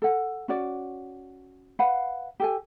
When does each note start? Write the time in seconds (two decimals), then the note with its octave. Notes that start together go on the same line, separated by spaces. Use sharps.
0.02 A4 F#5
0.48 C#4 F#4 D5
1.79 B4 F5 F#5 B5
2.40 G4 A4 G#5